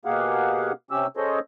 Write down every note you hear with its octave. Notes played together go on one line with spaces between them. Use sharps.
B2 A#3 G4 G#4 F5 F#5
C3 C#4 G4 E6
C#4 G#4 A4 C5 C#5 D#5